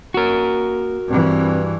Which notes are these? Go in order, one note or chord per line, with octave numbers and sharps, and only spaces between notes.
A#3 F#4 A#4
G2 E3 C4